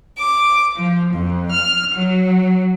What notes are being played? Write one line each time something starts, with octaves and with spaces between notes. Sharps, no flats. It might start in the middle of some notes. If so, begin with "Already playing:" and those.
D6
F3
F2
F6
F#3